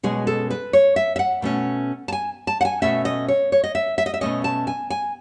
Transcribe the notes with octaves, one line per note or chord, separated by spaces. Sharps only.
B2 G#3 C#4 G#4
A4
B4
C#5
E5
E5
F#5
B2 A3 C#4
A5
G#5
A5
F#5
G#5
B2 A3 C#4 E5
D#5
C#5
C#5
D#5
E5
E5
D#5
E5
B2 A3 C#4 D#5
A5
G#5
G#5